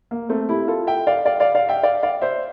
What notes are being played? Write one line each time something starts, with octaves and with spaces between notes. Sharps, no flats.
A#3
A3 C4
E4 G4
F4 A4
E5 G5
D5 F5
D5 F5
D5 F5
D5 F5
E5 G5
D5 F5
D5 F5
C5 E5